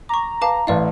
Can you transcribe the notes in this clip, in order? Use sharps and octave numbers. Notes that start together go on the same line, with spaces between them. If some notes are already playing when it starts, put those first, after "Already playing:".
A#5 C#6 D6
B4 F5 A5 D6
A1 E4 B4 D5 F5